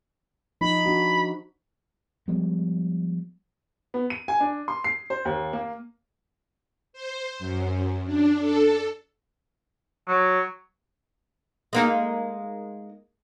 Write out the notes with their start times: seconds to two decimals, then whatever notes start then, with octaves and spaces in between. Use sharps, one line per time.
0.61 F3 D#4 B5
0.86 D4 F#4
2.28 F3 G3 G#3 B3
3.94 B3
4.10 D#7
4.28 G#5
4.40 D4
4.68 C6
4.84 C7
5.10 C5
5.25 D#2
5.53 A#3
6.93 C5
7.39 F#2
8.06 D4
8.40 A4
10.08 F#3
11.73 G#3 A#3 D#4